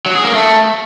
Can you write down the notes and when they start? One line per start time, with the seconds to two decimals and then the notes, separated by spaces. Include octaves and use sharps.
0.06 F#3
0.15 G#4
0.25 A#3
0.34 A3